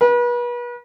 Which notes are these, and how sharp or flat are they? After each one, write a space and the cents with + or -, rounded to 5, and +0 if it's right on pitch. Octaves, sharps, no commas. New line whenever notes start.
B4 -35